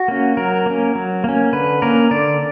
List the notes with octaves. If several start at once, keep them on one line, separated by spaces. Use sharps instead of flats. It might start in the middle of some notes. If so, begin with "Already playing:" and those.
Already playing: F#4
A#3 C#4
F#3 A#4
A#3 C#4
F#3
A#3 C#4
D3 B4
A#3 C#4 A#4
D3 D5